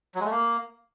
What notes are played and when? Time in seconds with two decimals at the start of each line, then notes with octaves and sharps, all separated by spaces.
0.15 F#3
0.20 G#3
0.25 A3
0.31 A#3